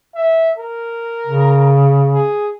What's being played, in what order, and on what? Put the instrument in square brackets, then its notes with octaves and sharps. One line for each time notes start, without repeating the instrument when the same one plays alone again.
[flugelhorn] E5
A#4
[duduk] C#3
[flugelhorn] G#4